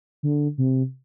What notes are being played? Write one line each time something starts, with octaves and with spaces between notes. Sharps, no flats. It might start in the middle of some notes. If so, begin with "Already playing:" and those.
D3
C3